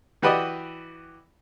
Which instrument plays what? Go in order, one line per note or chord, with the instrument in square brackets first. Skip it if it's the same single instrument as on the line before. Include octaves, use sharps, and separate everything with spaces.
[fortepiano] E3 F#4 G4 B4 D5 D#5